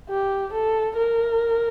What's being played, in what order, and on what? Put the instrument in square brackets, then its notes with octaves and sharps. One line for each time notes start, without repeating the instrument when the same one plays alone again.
[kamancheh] G4
A4
A#4